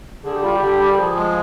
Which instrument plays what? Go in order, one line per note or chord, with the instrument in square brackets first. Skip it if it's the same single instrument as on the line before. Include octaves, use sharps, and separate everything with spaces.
[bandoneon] D3 [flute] G#4
[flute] G4
[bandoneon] G3 [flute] F4
[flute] G4
[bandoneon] D3
G3
[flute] A#4
[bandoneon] F3 [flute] G#4
[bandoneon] G#3